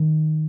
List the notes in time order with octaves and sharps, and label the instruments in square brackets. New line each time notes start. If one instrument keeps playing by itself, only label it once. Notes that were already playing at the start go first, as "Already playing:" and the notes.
Already playing: [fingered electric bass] D#3